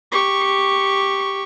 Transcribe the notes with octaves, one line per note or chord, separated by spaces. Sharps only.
G4 C#6